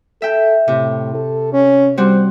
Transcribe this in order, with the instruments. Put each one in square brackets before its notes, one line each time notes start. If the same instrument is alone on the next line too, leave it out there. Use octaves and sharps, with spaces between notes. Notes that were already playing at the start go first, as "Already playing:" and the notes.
[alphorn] A4 [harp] E5 G5
[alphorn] A2 [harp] C3
[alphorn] A4
C#4
[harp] G3 C4 F#4 [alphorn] C5